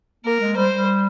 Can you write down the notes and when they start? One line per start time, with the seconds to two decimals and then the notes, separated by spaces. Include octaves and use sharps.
0.25 A#3 A#4
0.40 G#3
0.56 G3 C5
0.72 G3